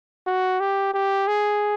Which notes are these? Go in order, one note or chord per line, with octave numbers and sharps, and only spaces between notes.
F#4
G4
G4
G#4